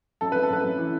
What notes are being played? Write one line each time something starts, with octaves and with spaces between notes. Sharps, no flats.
F#2 A4
B4
F#2
A4
F#2 B4
F#2
E3